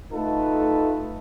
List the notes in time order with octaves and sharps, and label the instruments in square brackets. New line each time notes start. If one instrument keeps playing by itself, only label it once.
[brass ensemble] A3 D#4 F4 A4 B4